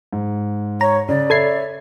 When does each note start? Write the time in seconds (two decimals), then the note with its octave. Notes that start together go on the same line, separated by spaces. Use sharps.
0.13 G#2
0.81 C#5 A#5
1.09 C#3 D5
1.30 A4 C#5 E5 B5 G#6 C7